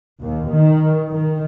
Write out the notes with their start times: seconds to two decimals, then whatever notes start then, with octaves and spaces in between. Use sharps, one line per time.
0.21 D#2
0.52 D#3
1.10 D#3